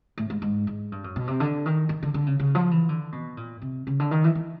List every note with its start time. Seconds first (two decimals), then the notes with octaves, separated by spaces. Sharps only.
0.18 A2
0.30 G#2
0.42 G#2
0.67 G#2
0.92 G2
1.04 F#2
1.16 B2
1.27 C3
1.40 D3
1.66 D#3
1.89 D#3
2.03 D3
2.14 D3
2.26 C#3
2.40 C#3
2.55 F3
2.71 E3
2.89 D3
3.12 B2
3.37 A#2
3.62 C3
3.87 C#3
4.00 D3
4.11 D#3
4.24 E3
4.35 E3